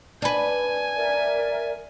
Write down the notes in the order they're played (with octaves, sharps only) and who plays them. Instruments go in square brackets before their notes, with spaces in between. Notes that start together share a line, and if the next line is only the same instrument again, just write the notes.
[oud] D4 B4 [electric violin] G#5
[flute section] A#4 D5 E5